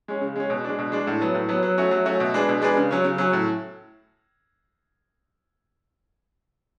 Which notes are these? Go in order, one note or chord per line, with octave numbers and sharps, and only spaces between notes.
G#3 C#4
C#3
G#3 C#4
B2
G#3 D4
B2
G#3 D4
A2
F#3 B3
A2
F#3 B3
F#3
A3 C#4 F#4
F#3
A3 C#4 F#4
B2
G#3 D4 G#4 B4
B2
G#3 D4 G#4 B4
C#3
F#3 C#4
C#3
F#3 C#4
A2